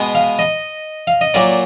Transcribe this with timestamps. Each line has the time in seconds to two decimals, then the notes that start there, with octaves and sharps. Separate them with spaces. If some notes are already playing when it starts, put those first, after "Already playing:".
Already playing: B2 G#3 B3
0.15 F5
0.39 D#5
1.07 F5
1.21 D#5
1.34 A#2 F#3 A#3 D5